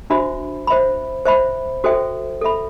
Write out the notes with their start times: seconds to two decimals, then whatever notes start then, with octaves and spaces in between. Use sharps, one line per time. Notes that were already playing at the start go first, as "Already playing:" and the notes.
0.10 D4 F#4 C5 E5 B5
0.67 C5 E5 B5
1.25 C5 E5 B5
1.84 F#4 A4 C5 E5 G5
2.41 A4 E5 B5